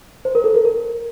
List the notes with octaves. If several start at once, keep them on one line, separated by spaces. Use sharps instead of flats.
C5
A#4
A4
A#4
A#4